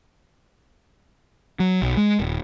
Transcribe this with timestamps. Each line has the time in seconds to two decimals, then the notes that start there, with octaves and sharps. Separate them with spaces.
1.60 F#3
1.82 B1
1.97 G#3
2.20 D#1